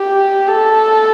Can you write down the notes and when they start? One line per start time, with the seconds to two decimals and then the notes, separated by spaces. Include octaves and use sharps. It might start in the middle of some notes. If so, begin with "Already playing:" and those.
Already playing: G4
0.48 A4